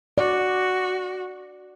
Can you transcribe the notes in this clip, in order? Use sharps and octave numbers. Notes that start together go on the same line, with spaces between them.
F#4 D5